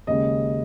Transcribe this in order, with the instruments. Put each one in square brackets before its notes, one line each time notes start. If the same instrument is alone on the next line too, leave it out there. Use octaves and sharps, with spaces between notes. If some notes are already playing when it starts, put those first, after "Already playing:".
[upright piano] D#2 C#3 G#3 D#5